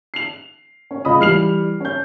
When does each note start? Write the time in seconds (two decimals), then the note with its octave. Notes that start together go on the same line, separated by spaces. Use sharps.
0.14 C7 F7
0.91 C#4
1.05 C#2 D#5 B5 D#6
1.19 E3 G3 F6 C7 F7
1.81 C#4 G6